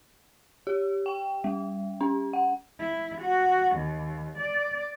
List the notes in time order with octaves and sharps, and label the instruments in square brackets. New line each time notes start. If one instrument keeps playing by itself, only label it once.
[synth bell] G4
G5
G3
C#4
F#5
[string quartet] E4
F#4
D#2
D5